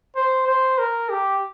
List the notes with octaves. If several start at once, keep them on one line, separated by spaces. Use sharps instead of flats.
C5
C5
A#4
G4